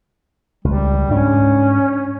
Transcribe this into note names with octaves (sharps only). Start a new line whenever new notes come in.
C#2 G3
G#2 C#4 D4